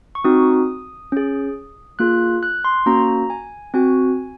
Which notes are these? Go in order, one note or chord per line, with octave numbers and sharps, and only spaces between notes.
C#6
C4 D#4 F#4 D#6
C#4 G#4
A#3 F4 G#4 F#6
F#6
C6
A#3 C#4 F#4 A#5
G#5
C4 F#4 G#5